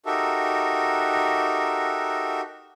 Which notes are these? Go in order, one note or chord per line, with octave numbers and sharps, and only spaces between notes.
D#4 F#4 G4 A4 A#4 E5